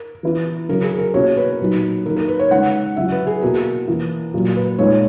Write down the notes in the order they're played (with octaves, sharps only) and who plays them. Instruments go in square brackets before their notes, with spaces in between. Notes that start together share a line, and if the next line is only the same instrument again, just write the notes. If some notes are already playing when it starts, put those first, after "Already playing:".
Already playing: [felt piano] A#4
[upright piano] E3 B3 E4
[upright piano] C#3 F#3 C#4 [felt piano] A#4
[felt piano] G#4
A#4
[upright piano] B2 A#3 C#4 E4 [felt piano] C#5
[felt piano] B4
[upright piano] A#2 F#3 B3 D#4
[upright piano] D#3 F#3 A#3 D#4 [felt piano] A#4
[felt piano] A#4
B4
C#5
[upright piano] C#3 G#3 D#4 [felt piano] F#5
[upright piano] C#3 F#3 C#4 E4 [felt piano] E5
[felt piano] B4
G#4
[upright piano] B2 A#3 E4 [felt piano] A#4
[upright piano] E3 A#3 E4
A#2 F#3 A#3
[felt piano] B4
[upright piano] A#2 G#3 B3 D#4 [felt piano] C#5